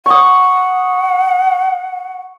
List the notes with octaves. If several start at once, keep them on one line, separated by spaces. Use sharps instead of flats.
F#5 C#6 D#6